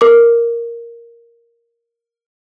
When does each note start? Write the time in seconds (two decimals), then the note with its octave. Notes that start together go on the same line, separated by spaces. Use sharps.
0.01 A#4 D6